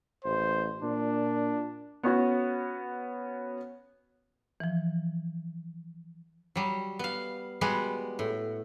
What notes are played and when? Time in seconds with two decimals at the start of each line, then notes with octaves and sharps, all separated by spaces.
0.25 A1 C5
0.83 A#2 D4
2.03 B3 C#4 F#4
4.60 E3 F3
6.55 F#3 G3
6.99 B3 F5
7.61 G3 G#3 B3 F#4 G#4
8.19 A2